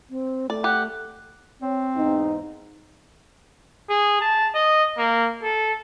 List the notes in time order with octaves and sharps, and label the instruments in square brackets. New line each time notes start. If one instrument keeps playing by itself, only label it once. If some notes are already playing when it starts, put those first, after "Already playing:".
[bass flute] C4
[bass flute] A3 [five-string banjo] D5
[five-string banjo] G4 [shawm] F#5
[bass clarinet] C4 [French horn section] C#5
[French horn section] E2 G#2 D#4
[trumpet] G#4
A5
D#5
A#3
A4